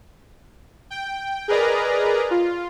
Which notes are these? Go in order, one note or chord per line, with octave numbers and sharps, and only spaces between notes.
G5
G#4 A#4 B4 D5 D#5 A#5
F4